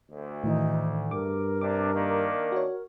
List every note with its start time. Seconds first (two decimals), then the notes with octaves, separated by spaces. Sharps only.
0.11 D2
0.44 A2 D#3 E3 D#4
1.11 G2 A#4 D6
1.61 C3 D4 D6
1.94 D#3 A#3 D4
2.52 F#4 C#5